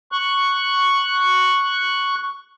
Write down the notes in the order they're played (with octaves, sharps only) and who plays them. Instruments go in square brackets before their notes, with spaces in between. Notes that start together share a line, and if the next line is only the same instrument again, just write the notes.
[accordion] C#6 F#6